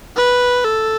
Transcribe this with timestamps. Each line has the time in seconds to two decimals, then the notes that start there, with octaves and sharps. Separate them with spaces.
0.17 B4
0.65 A4